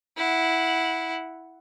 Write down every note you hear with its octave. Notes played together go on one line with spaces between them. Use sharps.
E4 F#5